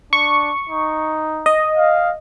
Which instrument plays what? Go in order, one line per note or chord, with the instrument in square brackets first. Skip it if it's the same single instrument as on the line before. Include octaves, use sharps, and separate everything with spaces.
[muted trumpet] D4 [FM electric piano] C#6
[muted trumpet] D#4
[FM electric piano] D#5
[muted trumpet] F5